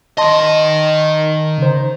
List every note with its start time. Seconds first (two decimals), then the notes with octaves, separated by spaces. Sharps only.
0.18 D#3 D#5 A5 C6
1.58 C#3 C5